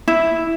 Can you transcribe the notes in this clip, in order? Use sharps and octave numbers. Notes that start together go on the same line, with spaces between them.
E4